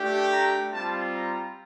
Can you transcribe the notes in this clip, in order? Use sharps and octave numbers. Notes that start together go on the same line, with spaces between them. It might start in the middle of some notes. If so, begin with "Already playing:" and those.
Already playing: A3 D4 G4
A#5
G3 C4 F4 A5
A#5